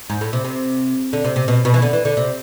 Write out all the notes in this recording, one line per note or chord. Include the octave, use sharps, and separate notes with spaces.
G#2
A2
C3
C3
D3
C3
C3
B2
B2
E3
D3
E3
D3
C3